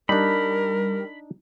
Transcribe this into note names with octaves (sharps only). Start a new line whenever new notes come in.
G3 D4 D#4 A#4 B5